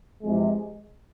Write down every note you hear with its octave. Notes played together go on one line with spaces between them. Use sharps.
F2 C3 E3 G#3